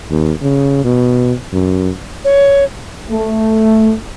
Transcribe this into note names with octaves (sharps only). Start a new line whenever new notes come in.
D#2
C#3
B2
F#2
C#5
A3